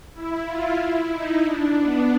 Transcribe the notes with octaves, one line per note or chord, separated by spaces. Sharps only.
E4
F4
E4
D#4
D4
B3